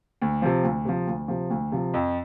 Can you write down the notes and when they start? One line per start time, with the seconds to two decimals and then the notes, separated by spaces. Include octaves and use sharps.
0.22 D2
0.42 C3 F3
0.64 D2
0.85 C3 F3
1.07 D2
1.28 C3 F3
1.50 D2
1.72 C3 F3
1.94 F2